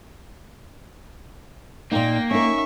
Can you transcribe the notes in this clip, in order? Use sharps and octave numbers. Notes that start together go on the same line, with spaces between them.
A#2 A#3 D#4 G5
C#4 D#4 A#4 E5 C#6